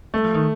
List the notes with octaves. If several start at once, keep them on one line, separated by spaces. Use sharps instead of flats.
G3 A3
F3
D#3